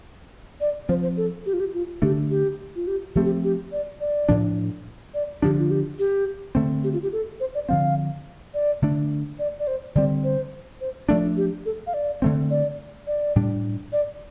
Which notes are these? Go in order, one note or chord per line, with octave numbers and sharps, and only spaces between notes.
D5
F3 C4 C5
C5
A4
G4
F4
G4
F4
D3 A3 D4 G4
G4
F4
G4
F3 A3 C4 G4
G4
G4
D5
D5
A2 F3 D4
D5
D3 F3 D4 G4
F4
G4
G4
D3 A3 C4
G4
F4
G4
A4
C5
D5
D3 F3 C4 F5
D5
D3 A3 D4
D5
D5
C5
D3 G3 C4 D5
C5
C5
F3 A3 D4 D5
G4
A4
F5
D5
D3 A3 C4
D5
D5
A2 G3 D4
D5